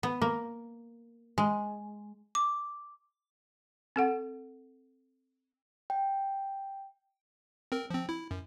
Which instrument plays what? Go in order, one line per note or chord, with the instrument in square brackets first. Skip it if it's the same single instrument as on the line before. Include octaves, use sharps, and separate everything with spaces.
[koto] B3
A#3
G#3
[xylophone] D6
[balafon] C4 A4 F#5
[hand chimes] G5
[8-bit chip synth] C4 A#4
F3 C4
E4
F#2